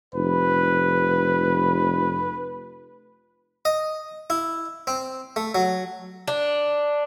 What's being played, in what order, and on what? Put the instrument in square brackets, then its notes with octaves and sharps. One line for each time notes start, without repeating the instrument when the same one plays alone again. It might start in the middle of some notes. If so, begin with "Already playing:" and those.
[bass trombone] F1 [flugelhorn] B4
[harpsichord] D#5
E4
C4
A3
F#3
[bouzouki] D4